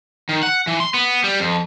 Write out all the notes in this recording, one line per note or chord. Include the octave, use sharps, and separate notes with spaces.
D#3
F#5
E3
C6
B3
G3
F2